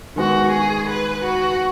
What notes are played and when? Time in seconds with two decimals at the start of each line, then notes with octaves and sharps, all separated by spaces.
0.16 D#3 G#3 B3 F#4
0.52 G#4
0.89 B4
1.25 F#4